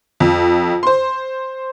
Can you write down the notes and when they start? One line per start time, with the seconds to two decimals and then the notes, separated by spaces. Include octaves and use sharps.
0.20 F2
0.83 C5 C6